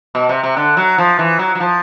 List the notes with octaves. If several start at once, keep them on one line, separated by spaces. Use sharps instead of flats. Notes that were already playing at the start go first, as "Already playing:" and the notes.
B2
C3
C3
D3
F#3
F3
E3
F#3
F#3
F3